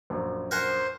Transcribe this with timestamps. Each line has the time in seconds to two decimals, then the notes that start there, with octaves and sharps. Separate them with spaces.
0.10 A#1 F#2
0.51 A#4 C5 F#5 G#5